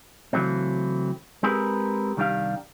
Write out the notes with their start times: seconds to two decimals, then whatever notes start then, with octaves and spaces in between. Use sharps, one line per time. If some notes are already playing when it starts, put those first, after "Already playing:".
0.33 C#3 E3 F#3 A3 C4
1.43 G#3 C4 G4 G#4 A#4 B4
2.17 C2 D#3 G3 D4 G4 F5